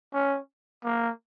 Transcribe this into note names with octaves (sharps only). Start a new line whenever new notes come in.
C#4
A#3